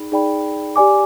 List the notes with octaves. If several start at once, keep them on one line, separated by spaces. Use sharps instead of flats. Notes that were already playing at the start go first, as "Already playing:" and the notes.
Already playing: D#4 G#4 D5 G5 B5
D#4 G#4 D5 G5 B5
G4 D5 G#5 D6